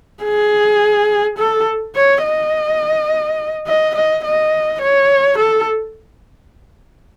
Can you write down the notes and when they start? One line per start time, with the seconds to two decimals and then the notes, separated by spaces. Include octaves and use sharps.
0.24 G#4
1.38 A4
1.96 C#5
2.24 D#5
3.67 D#5
3.95 D#5
4.24 D#5
4.81 C#5
5.38 A4